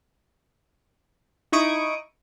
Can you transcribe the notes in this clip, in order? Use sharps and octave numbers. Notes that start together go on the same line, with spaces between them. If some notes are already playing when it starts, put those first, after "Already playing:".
D#4 E4 C#6 D#6 D7